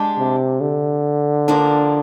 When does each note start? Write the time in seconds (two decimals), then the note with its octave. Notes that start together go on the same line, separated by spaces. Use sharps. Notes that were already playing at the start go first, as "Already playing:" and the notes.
Already playing: G#3 D4 G4
0.17 C3
0.61 D3
1.48 F3 A#3 D4